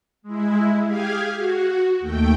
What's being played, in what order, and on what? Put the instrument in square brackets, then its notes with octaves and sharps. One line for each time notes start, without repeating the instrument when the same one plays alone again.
[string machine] G#3 E4
G4 G#4 F5 G#5
F#4
D#2 A3 G5